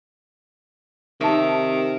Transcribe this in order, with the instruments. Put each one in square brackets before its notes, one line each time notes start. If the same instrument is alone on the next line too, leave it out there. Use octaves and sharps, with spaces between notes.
[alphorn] C3 [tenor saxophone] D#3 [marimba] D#4 A5 [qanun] E5